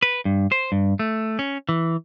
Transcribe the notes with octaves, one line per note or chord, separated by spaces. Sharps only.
B4
G2
C5
G2
A3
C#4
E3